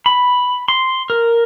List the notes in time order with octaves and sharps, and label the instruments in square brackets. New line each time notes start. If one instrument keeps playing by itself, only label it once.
[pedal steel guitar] B5
C6
A#4